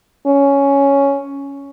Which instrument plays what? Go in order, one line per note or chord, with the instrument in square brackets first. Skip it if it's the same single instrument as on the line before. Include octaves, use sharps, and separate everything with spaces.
[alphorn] C#4